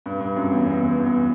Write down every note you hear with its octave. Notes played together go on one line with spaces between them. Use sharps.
G2
G2
F#2
E2
E2
E2